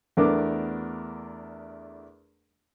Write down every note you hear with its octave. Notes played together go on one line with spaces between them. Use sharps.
E2 A3 B3 D4 A#4 D6